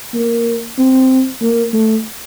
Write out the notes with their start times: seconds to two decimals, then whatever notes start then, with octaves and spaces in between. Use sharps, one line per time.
0.15 A#3
0.78 C4
1.42 A#3
1.73 A3